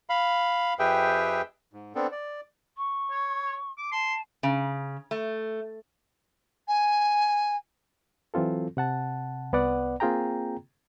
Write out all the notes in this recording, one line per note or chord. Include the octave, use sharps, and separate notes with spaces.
F5 B5
F2 G4 G#4 B4 E5 G5
G#2
B3 C4 D4 A4
D5
C#6
C#5
D6
A5 C6
C#3
A3
G#5
E3 F#3 C4 F4 A4
C3 F#5 A5
C2 B3 B4 D5 F#5
A#3 C4 F4 G#4 G5 A#5